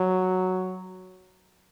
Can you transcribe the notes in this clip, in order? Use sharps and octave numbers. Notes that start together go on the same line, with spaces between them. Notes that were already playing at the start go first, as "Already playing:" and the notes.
Already playing: F#3